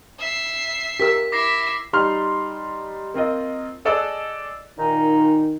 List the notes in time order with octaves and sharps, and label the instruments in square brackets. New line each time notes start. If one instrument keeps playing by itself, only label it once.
[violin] E5 C7
[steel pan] G4 A#4 E6 [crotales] B6
[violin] E4 E5 [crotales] D6 A#6 C7
[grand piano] G3 D#4 C6 F6 C7
A#3 C4 F4 D#5
G#4 A4 D5 D#5 E6 F#6
[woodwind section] A#2 D#4 [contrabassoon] D#3